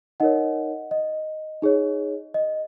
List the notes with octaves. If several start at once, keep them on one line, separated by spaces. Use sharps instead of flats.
D#4 A#4 C#5 D#5 F#5
D#5
D#4 G#4 C#5
D#5